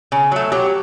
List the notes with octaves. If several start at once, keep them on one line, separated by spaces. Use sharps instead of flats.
C#3
F#3 A3
F#3 G4